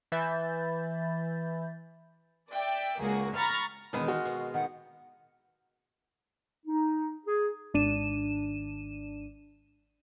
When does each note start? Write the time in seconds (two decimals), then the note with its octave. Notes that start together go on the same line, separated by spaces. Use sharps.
0.12 E3 B4 E5 B5 G6 A6
2.52 D5 E5 G5
3.00 C#2 A#3 F#4 G#4
3.36 A#5 B5 C#6 F6 A6
3.93 E1 D#3 G#3 B3 B5
4.08 F4 F#4
4.25 B2
4.54 D#3 F#5
6.66 D#4
7.26 G#4
7.74 G#1 D4 D#7 E7